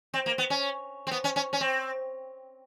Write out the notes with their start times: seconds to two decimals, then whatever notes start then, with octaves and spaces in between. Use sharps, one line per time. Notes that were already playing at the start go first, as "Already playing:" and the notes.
0.14 C4
0.26 A#3
0.38 B3
0.50 C#4
1.07 C4
1.11 B3
1.24 C#4
1.36 C#4
1.53 C#4
1.61 C4